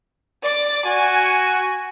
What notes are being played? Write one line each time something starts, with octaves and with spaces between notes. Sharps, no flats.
D5 D6
F#4 G#5